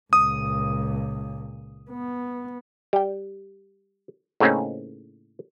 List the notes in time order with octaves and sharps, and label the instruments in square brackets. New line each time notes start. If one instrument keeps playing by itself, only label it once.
[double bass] C#2 A#2 [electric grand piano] D#6
[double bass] B3
[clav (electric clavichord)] G3 G5
A2 C#3 A#3 C4 C#4 D#4